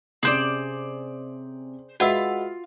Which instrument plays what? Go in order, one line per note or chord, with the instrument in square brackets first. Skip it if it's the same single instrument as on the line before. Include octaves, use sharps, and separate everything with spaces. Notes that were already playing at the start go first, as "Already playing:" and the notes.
[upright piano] C3 C#4 [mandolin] G#4 C5 D5
[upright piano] G#3 B4 E5 [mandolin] F4 [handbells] F#4 F#5 E6